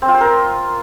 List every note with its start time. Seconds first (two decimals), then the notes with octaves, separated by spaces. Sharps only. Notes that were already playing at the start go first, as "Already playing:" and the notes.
0.02 C4
0.08 F4
0.14 C5
0.21 A#4